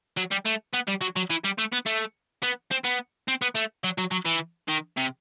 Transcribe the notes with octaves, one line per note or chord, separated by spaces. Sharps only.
F#3
G3
A3
B3
G3
F#3
F#3
E3
G3
A3
B3
A3
B3
C4
B3
C4
B3
A3
F#3
F#3
F#3
E3
D#3
C3